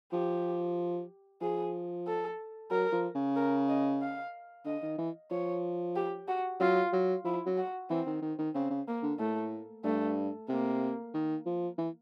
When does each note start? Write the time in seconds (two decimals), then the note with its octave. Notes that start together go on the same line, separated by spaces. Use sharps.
0.13 F3 G4
1.41 F3 G#4
2.07 A4
2.71 F#3 A#4
2.93 F3
3.15 C#3
3.36 A#4
3.68 D#5
4.02 F5
4.65 D3 D#5
4.83 D#3
4.99 E3
5.31 F3 C#5
5.96 G4
6.28 F#4
6.60 F#3 F4
6.93 F#3
7.25 F3 E4
7.46 F#3
7.57 F#4
7.90 E3 C4
8.07 D#3
8.22 D#3
8.39 D#3
8.54 C#3 C4
8.70 C#3
8.88 A#3
9.03 D3
9.19 A2 A3
9.84 G2 A3
10.49 C3 A#3
11.14 D#3
11.46 F3
11.78 E3